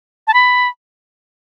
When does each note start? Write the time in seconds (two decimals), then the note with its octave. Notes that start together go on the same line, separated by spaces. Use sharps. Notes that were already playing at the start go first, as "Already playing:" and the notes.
0.27 A5
0.34 B5